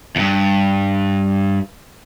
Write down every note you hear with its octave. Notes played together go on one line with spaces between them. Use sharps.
E2 G2